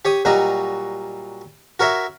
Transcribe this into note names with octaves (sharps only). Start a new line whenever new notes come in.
G4 C#5 D#6
A#2 F#3 G3 F#4 D#5 A#5
F#4 A#4 C#5 E5